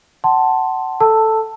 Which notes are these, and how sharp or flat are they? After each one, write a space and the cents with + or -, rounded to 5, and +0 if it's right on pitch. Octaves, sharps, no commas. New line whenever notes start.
F#5 +25 A5 +0 C6 +0
A4 +0 A5 +15 E6 +0